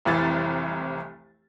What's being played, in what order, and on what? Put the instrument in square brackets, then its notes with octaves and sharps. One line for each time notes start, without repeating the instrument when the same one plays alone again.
[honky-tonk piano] F1 C2 E3 A6